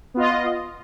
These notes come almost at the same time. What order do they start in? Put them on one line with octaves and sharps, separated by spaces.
B3 F4 D#5